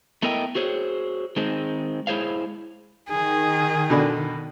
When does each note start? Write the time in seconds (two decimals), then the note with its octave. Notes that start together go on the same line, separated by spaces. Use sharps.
0.23 A3 B3 E4 A#4 D#5 G5
0.55 F#4 G#4 C5 C#5
1.36 D#3 G#3 C4 D#4
2.07 G#3 E4 G#4 C5 C#5 F5
3.09 D#3 G#4
3.90 B2 D3 D5